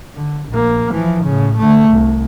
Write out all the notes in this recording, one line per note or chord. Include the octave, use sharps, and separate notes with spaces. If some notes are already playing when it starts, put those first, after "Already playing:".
D3
A#1 A#3
E3 F3
A2 C#3
D3 A3
C2